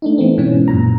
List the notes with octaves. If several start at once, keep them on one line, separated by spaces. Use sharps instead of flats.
A3 D4 D#4
E3 A3 B3 C4
G#2 B2 E3 C#4
F#2 A#2 A#5